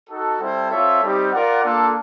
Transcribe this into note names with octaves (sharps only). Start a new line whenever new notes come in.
D#4 F#4 A4
G3 C4 E4 A4 C5
C4 F4 A4 C#5 E5
G3 C4 D#4 G4
F4 A#4 D5 F#5
A#3 D4 F4 A4